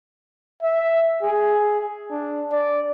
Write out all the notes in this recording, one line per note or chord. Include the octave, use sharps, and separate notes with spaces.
E5
G#4
D4
D5